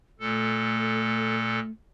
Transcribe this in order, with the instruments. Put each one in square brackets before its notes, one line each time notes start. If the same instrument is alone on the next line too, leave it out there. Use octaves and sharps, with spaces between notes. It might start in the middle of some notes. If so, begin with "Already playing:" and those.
[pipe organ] A#2 A4 [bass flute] A3